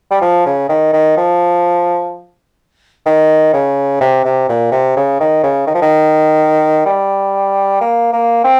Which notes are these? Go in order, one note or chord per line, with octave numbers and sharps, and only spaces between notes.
G3
F3
C#3
D#3
D#3
F3
D#3
C#3
C3
C3
A#2
C3
C#3
D#3
C#3
D#3
F3
D#3
G3
A#3
A#3
C4